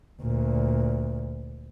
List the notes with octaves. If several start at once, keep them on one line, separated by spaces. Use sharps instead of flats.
D2 A#2